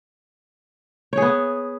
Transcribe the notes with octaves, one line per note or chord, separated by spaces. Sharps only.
B3 G#4 C#5